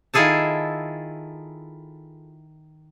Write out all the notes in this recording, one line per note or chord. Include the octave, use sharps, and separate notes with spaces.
D#3 E4 F4 G#4 A4 A5